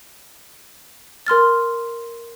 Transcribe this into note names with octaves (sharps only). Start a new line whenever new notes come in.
A#4 C6 F6 A6